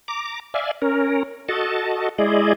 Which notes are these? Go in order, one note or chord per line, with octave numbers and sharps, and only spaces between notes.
A#5 D6
D5 E5 F5 G#5
C#4 A#4
F#4 A4 D#5 A5
G#3 E4 G#4 D5 D#5